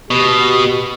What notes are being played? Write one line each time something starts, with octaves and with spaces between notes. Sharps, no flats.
B2 G4